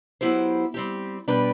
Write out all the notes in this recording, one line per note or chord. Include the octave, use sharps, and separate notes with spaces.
F#3 B3 E4 G4 C5
G3 C4 G4
B2 G3 D4 G4 B4